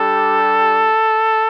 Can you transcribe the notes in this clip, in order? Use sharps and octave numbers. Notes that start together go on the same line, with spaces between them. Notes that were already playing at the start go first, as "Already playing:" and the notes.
Already playing: G3 D4 G4 A4